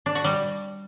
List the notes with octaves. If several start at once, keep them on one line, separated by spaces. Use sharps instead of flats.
D4
F#4
G3